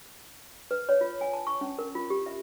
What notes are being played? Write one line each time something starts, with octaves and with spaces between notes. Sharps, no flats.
B4
C#5
F4
G#5
A5
C#6
C#4
A#4
F4
G4
E5